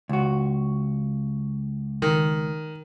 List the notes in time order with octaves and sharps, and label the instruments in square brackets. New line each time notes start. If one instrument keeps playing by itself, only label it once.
[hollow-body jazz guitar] C#2 F#4
[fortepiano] D#3